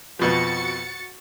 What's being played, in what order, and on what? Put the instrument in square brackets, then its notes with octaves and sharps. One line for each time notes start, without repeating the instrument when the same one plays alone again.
[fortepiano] F2 B2 F3 [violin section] F#4 A6 C#7